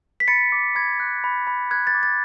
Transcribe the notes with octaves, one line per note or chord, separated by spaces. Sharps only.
B6
B5 A6 C#7
D6
B5 G#6
F#6
B5
B5
F#6 G#6
A6
D6
A6